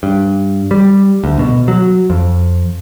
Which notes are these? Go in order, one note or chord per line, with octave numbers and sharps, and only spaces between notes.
G2
G3
D2
B2
F#3
F2